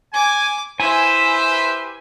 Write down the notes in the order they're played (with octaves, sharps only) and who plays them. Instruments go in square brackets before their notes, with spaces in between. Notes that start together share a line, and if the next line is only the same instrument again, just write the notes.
[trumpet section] G#5 [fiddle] D6
[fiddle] E4 E5 [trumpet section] G4 B4 C5 [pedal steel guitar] G#5